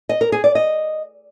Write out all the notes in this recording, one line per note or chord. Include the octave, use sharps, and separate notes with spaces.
D#5
A#4
G#4
D5
D#5